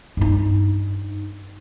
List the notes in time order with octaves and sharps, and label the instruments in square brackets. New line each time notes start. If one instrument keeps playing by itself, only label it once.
[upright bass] G2 D#4